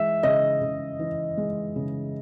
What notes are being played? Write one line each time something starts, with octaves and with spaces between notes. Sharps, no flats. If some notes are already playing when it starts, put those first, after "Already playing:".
Already playing: E3 G#3 E5
C#3 D#5
C#3
E3
G#3
C#3